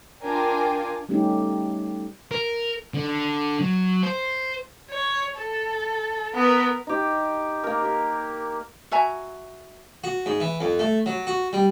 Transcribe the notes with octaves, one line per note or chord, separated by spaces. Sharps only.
D4 F4 A#4 G5 G#5 D6
G3 A3 C#4 D#4 G4
A#4
D3
F#3
C5
C#5
A4
B3 A#4 B4
D#4 G4
A#3 A#4
G4
F#4 E5 G#5 A#5
F#4
G#2
E3
F2
A3
F#3
F#4
G3